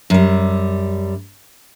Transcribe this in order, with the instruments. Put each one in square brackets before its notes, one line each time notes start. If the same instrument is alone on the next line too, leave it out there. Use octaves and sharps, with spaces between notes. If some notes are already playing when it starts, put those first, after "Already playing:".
[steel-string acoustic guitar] F#2 G3